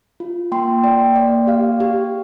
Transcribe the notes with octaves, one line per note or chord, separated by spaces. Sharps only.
F4
A#3 G5 C6
A#3 D5 G5
A#3 D5
G4 F5
G4